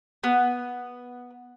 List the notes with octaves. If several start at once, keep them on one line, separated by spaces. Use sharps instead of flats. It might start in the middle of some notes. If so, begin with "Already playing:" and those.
B3